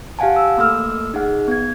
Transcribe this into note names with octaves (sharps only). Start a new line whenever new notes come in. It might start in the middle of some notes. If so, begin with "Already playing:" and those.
G4 F5 F#5 G#5 A5
E6
A3 A#3 A4 E6 F6
D#4 G#4 F#5
B3 G#6